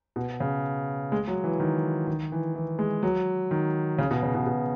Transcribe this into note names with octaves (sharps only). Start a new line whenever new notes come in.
B2
C#3
G#3
F#3
E3
D#3
D#3
E3
E3
G#3
F#3
D#3
C#3
B2
C#3
B2
B2